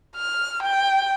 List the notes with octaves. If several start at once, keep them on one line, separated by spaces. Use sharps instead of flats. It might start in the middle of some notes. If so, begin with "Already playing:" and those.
F6
G5